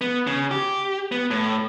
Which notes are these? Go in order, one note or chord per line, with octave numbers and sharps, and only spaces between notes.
B3
C#3
G4
B3
A2